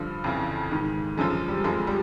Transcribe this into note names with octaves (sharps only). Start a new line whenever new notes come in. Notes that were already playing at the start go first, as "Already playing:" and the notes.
Already playing: G2 D3 F3
F2 C#3 E3
G#2 D#3
F#2 D3 F3 G#3
G3
F2 D3 F3 G#3
G3